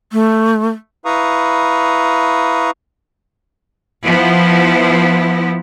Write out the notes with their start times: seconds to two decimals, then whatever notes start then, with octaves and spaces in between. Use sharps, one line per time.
0.13 A3
1.05 E4 B4 F5 A#5 C#6 D#6
4.04 F3 B3 E4